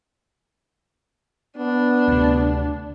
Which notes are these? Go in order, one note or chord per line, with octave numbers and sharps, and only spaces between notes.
B3 D4
D2 C3